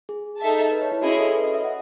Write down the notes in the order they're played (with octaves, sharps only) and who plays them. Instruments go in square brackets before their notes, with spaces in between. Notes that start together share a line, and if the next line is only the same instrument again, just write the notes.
[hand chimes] G#4
[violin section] D#4 A4 E5 A5
[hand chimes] B4
C#5
E4
[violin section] C#4 E4 G#4 D#5 [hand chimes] F#4
[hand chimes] A4
B4
D#5
E5
F#5